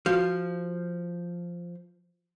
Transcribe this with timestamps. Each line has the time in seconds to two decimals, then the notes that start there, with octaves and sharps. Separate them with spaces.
0.06 F3 F#4